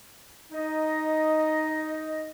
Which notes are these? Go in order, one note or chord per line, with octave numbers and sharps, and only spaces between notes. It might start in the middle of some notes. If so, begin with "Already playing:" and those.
D#4 D#5